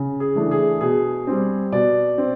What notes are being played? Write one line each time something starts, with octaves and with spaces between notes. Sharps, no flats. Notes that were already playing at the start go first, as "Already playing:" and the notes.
Already playing: C#3
G#4
E3 A3 D4
G#4
B2 G#4
G3 C4
B2 D5
C4